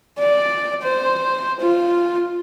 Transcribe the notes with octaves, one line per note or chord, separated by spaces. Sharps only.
D5
C5
F4